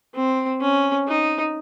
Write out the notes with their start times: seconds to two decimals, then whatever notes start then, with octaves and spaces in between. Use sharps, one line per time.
0.15 C4
0.61 C#4
1.08 D#4